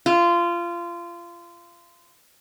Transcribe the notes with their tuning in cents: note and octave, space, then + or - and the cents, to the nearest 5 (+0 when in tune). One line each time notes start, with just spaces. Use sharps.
F4 -25